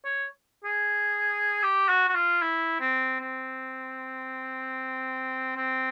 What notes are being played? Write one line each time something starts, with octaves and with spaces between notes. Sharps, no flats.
C#5
G#4
G4
F#4
F#4
F4
E4
C4
C4
C4